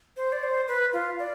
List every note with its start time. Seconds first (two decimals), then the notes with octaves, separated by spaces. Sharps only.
0.17 C5
0.32 D5
0.43 C5
0.68 B4
0.93 F4
1.19 D5